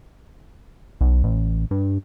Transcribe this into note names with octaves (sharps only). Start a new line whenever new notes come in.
B1
A1
G2